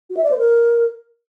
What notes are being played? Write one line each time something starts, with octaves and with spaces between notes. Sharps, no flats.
F#4
E5
D5
C5
A#4